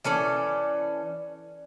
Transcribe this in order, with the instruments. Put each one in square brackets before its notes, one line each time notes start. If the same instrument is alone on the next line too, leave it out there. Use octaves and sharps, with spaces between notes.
[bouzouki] E3 C#4 A4 D5